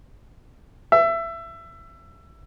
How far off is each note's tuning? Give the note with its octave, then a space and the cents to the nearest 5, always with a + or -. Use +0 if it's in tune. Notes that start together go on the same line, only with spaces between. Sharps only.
E5 +20